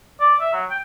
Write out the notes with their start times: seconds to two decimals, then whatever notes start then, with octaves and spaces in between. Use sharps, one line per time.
0.20 D5
0.40 E5
0.53 F#3
0.70 G5